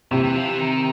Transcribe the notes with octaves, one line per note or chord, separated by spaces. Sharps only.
C3 E3
E3
F3
E3
D#3